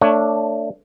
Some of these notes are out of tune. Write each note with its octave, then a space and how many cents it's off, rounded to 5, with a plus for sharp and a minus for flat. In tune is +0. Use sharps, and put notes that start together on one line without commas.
A3 +25 D4 +0 C#5 +0